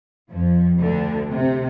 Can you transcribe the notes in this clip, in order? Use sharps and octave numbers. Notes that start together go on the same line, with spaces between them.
F2 F3
D2 D3
C3